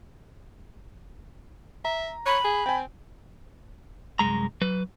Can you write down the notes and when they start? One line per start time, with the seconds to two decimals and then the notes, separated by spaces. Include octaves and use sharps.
1.85 E5 A#5
2.26 C#5 B5
2.44 G#4
2.66 C4 G5 G#5
4.19 C2 F#2 G#3 A#5
4.61 F#3 B4